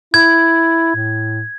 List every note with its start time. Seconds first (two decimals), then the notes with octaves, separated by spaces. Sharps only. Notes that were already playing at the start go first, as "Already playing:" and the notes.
0.14 E4 G#6
0.95 A2